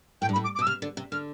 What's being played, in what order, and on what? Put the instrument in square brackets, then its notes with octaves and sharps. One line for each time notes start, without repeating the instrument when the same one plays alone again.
[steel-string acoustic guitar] A2 [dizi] G5
[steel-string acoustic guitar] G2
[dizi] B5
[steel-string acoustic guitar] A2
[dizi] D6
D6
[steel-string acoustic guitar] B2
[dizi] E6
[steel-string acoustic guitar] C3 [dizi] F6
[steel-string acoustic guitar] D3
C3
[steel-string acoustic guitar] D3 [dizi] F6